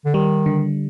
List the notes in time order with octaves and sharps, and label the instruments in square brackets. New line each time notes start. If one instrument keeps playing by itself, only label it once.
[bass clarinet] D3
[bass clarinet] D#3 [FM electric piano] G3
[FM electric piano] D3